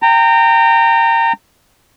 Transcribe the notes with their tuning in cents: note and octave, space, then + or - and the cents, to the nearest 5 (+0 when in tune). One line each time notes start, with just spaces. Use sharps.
G5 +0 A#5 -25